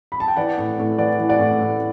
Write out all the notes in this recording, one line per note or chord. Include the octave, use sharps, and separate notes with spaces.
B5
A5
G5
E3 D5 F#5
A2
A2
E3 D5 F#5
E3
D5 F#5
A2
A2